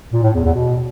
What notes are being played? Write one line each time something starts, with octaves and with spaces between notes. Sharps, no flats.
A#2
A2
E2
E2
B2